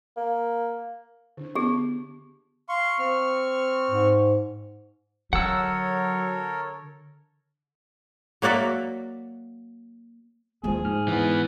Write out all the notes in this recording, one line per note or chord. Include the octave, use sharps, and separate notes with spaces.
A#3
D3 D4
B3 F4 G4 G#4 A5
F5 C6 C#6
C4 C#6 F6
G#2
D3 F#3 A4 A#4 C#5 F#5 E6
F#3 A#3 F#4 D5 E5
D#2 D3 F3 G#3 G#4
G#2 F6
E3 B3